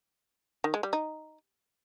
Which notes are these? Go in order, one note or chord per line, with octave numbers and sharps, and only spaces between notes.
D#3
G#3
G3
D#4